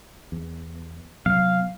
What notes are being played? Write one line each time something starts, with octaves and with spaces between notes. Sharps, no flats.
E2
C3 F#3 B3 F5